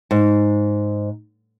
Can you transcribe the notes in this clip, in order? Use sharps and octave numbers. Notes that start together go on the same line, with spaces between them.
G#2